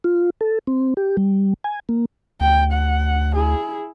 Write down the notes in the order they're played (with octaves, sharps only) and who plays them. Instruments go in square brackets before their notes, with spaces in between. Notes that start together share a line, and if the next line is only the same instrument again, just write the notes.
[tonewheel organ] F4
A4
C4
G4
G3
G#5
A#3
[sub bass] D2 [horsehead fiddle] G5
[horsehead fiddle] F#5
E4 G#4